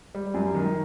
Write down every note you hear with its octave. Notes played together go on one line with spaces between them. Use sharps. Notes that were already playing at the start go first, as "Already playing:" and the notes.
G3
F#2
D#3